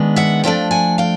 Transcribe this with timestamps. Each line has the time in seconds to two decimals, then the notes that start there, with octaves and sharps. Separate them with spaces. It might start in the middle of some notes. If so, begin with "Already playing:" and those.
Already playing: D#3 G#3 B3 D4
0.16 E5 F#5
0.44 F3 A3 D4 F5 G5
0.71 F#5 G#5
0.98 F5 G5